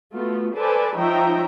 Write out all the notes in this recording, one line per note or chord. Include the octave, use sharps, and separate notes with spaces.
A3 B3 F4 F#4 A4
A4 B4 C5 D5 G#5 A5
F3 D#4 C#5 E5 G5 A#5